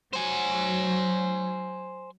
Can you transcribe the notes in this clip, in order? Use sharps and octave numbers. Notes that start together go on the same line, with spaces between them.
F#3 C5 G#5